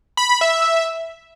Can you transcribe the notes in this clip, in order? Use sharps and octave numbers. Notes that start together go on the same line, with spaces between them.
B5
B5
E5